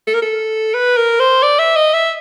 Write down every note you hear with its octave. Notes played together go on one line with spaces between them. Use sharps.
A4
A#4
A4
B4
A#4
C5
D5
E5
D#5
E5